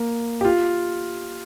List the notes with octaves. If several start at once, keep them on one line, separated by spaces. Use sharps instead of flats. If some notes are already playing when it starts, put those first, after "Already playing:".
Already playing: A#3
G4
F4